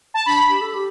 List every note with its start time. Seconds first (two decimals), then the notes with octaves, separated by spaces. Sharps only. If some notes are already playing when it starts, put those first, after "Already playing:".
0.14 A5
0.26 D4 B5
0.49 G4
0.61 A4
0.74 G4